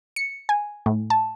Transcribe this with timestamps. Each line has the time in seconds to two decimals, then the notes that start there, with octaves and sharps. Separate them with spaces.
0.16 C#7
0.49 G#5
0.86 A2
1.10 A5